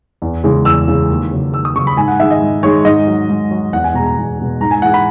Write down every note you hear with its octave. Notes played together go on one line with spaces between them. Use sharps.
E2
C#3 E3 G#3
E2 E6
C#3 E3 G#3
D#2
C#3 F#3
D#2 E6
D#6
C#3 F#3 C#6
B5
G#2 G#5
F#5
D#3 G#3 E5
D#5
G#2
D#3 G#3 C#5
G#2 D#5
F#3
G#2
F#3
E2 F#5
G#5
B2 G#3 A#5
A#5
E2
B2 G#3
G#2 A#5
G#5
E3 G#3 F#5
B5